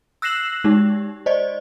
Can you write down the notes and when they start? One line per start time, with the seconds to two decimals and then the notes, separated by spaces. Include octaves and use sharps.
0.22 E6 F#6 A#6 C7 E7 F#7
0.64 G#3 D#4 G4
1.26 C5 D5 D#5